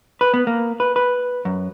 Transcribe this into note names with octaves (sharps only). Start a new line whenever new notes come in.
B4
B3
A#3
B4
B4
F#2